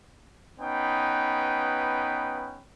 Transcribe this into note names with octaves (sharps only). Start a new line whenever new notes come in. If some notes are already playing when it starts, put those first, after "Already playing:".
B3 C#4 D#4 B4 G5